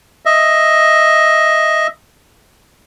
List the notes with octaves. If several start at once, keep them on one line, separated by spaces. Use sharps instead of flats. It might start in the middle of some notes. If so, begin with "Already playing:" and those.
D#5 E5